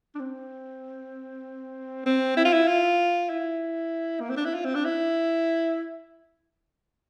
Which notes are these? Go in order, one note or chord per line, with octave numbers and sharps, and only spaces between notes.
D4
C4
C4
E4
F4
E4
F4
E4
A#3
C4
D4
E4
F4
C4
D4
E4